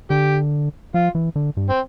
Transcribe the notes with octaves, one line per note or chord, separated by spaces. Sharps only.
D3 G4
F3 F4
E3
D3
G2
C4